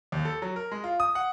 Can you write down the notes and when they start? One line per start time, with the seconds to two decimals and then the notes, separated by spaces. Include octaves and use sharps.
0.12 D#2
0.25 A4
0.42 F#3
0.56 A#4
0.71 G#3
0.84 F4
1.00 D#6
1.15 F#5